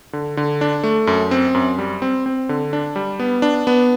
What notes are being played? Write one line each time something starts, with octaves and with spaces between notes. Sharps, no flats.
D3
D3
D4
A3
F#2
C4
F#2
G3
C4
C4
D3
D4
G3
B3
D4
B3